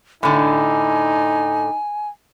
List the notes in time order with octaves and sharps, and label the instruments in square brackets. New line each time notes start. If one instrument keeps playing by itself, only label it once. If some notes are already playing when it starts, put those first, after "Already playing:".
[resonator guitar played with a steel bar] A2 D3 [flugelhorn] D#4 [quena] G#5